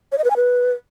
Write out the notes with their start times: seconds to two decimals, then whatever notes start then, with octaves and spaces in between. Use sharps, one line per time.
0.12 C#5
0.18 D#5
0.24 B4
0.30 G#5
0.36 B4